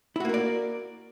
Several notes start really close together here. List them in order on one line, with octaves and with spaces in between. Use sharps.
E4 F#4 A#3 A#4 D5